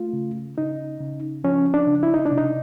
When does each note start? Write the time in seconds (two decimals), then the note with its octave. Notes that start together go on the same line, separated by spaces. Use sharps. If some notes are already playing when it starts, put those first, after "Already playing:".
Already playing: A3 F4
0.13 C#3
0.58 C#3 D#4
1.01 C#3
1.44 F3 C#4
1.74 D4
1.87 C#3
2.03 E4
2.14 D#4
2.26 D4
2.31 C3
2.38 D#4